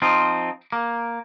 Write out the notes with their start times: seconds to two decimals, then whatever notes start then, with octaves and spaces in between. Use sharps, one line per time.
0.02 F3 C4 D#4 F4
0.72 A#3